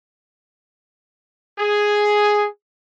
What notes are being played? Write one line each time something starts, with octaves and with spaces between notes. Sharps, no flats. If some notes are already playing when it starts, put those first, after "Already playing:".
G#4